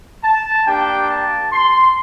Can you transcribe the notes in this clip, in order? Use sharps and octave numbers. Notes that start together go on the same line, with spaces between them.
A5
A#3 D4 G4 G5
A5
C6